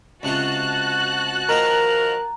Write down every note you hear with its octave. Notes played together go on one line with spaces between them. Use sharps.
C#2 C3 F4 F#4 A5 F#6
D#3 F3 A#3 A#4 A#5